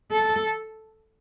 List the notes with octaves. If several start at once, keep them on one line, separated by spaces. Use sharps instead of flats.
A4